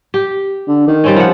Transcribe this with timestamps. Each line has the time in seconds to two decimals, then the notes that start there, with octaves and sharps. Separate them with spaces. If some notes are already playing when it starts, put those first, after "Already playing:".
0.14 G4
0.68 D3
0.87 D#3
1.04 G3 C4 C#4
1.16 F3 F#5